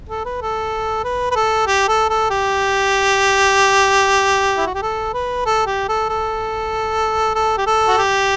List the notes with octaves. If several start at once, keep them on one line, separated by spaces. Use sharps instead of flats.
A4
B4
A4
B4
B4
A4
G4
A4
A4
G4
E4
F#4
G4
A4
B4
A4
G4
A4
A4
A4
G4
A4
F#4
G4